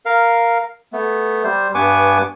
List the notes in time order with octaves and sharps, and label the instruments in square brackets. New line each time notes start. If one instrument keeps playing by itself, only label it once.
[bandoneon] A#4 F5
A3 B3
G3 C5
G2 B3 B4 G#5 C#6 D6